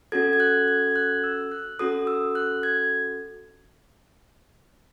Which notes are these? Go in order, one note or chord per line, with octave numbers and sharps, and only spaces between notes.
C#4 F#4 A4 G#6
G#6
F#6
G#6
G#6
F#6
E6
F#6
C#4 F#4 A4 D#6
E6
F#6
G#6